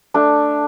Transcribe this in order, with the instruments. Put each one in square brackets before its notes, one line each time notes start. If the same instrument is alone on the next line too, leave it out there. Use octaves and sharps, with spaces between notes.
[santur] A3 D4